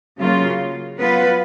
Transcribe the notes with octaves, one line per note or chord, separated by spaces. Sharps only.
C#3 F#3 A#3 F4
F#3 B3 F4 B4